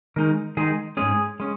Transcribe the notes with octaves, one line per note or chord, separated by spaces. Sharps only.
D#3 G#3 D#4 A#4
D#3 G#3 D#4 G#4
G#2 G#3 C#4 G#4
G#3 C#4